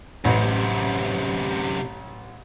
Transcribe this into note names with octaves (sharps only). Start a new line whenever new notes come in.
A1 F#2 C3